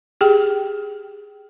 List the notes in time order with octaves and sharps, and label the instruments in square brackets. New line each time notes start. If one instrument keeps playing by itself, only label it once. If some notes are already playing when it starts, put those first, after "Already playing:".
[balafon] G4 G#4 G5